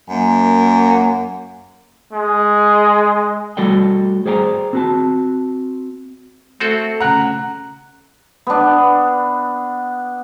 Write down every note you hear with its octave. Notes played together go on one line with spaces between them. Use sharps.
F#2 A#3
G#3
G3 A3 F#4 A4 D5 G5
G#4 C5 D5 G5 G#5 A#5
C4 F#4 A5
A3 C4 F#4 A4
C#3 F#5 A#5 F#6
B3 D4